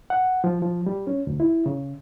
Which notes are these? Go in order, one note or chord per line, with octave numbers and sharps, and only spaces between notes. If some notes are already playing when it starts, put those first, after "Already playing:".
F#5
F3
F3
G3
C#4
D2
E4
C#3